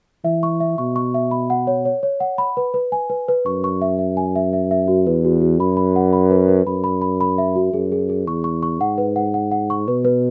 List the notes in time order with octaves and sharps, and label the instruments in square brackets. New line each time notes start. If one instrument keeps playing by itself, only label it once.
[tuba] E3 [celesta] E5
[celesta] C#6
E5
[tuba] B2 [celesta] C#6
[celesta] C#6
E5
B5
F#5
C#5
C#5
C#5
F#5
B5
B4
B4
G#5
B4
B4
[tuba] F#2 [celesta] C#6
[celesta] C#6
E5
E5
G#5
E5
E5
E5
F#4
[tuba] E2 [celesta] B4
[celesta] F#4
F#4
[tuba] F#2 [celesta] B5
[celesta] B5
F#5
B5
B4
B4
[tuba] F#2 [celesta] B5
[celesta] B5
B5
B5
E5
F#4
[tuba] F#2 [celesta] G#4
[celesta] G#4
G#4
[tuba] E2 [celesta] C#6
[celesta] C#6
C#6
[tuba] G#2 [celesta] F#5
[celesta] B4
F#5
F#5
F#5
C#6
[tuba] B2 [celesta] B4
[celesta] B4